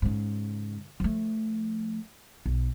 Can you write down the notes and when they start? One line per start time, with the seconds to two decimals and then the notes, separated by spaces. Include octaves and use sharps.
0.02 G#2 C#3
1.00 F3 A3
2.46 B1